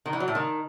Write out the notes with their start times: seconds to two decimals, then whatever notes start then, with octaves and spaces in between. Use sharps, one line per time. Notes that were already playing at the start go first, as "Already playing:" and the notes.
0.06 D#3
0.13 E3
0.20 F#3
0.28 A2
0.35 D#3